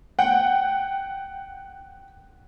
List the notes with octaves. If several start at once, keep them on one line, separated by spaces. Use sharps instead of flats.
F#5 G5